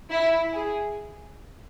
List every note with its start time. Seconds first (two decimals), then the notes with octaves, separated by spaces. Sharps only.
0.11 E4
0.54 G#4